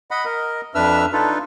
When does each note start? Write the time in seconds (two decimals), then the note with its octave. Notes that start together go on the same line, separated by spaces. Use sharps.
0.11 D#5 F#5 B5
0.25 A#4 D#5
0.75 F2 D4 B4 E5 E6 F6
1.13 D4 D#4 F4 A4 B4